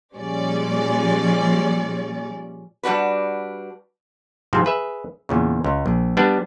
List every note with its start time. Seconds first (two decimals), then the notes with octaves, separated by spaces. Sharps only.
0.15 A#2 F3 G3 G#3 C#4 D5
2.83 G3 D4 F#4 B4
4.53 G#2 C3 F3 C4
4.65 G#4 B4 E5
5.29 E2 A#2 C#3
5.64 C#2
5.86 A#1
6.17 G3 B3 D4